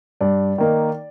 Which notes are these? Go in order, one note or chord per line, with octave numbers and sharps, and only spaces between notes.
G2 D5
D#3 A#3 D#4